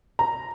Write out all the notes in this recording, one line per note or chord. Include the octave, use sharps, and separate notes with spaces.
A#5